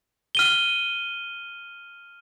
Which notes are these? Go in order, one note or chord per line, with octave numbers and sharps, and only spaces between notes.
F6 D#7 G7